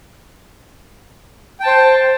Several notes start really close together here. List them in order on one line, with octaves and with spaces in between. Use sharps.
G5 A5 C5